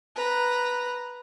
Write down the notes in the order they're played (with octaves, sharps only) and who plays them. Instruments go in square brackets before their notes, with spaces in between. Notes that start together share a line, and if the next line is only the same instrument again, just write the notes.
[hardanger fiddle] B4 A#5